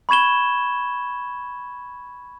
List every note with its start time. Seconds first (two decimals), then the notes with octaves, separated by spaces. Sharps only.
0.09 B5 C#6 G#6 E7 G7